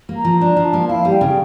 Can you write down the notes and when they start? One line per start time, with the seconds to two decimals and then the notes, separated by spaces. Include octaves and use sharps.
0.09 A#3
0.16 A#5
0.25 F3
0.41 D4 A#5
0.57 F3
0.65 A5
0.73 A#3
0.88 E4 F5
1.05 G3
1.12 G5
1.21 C#3